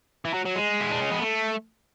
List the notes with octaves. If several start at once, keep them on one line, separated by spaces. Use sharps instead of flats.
E3
F#3
F#3
G#3
E4
D4
C#4
B3
A3